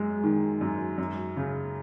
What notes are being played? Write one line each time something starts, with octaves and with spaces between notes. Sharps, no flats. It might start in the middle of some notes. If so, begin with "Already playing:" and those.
Already playing: F#2 G#3
D#3
F#2
F#2
C#3